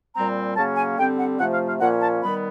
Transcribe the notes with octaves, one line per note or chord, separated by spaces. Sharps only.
A#2 G3 C4 A#5
C#3 F#3 A#3 C#4 A5
G#5
D3 G3 C4 G5
F#5
C3 F3 A3 F#5
F5
F5
A#2 F3 A#3 C#4 F#5
A5
D#3 G3 B3 B5